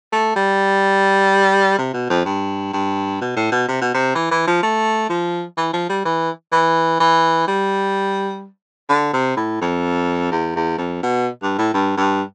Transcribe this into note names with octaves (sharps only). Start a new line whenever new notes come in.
A3
G3
C3
B2
F2
G2
G2
B2
A2
B2
C3
B2
C3
E3
E3
F3
A3
F3
E3
F3
G3
E3
E3
E3
G3
D3
C3
A2
F2
E2
E2
F2
B2
G2
A2
G2
G2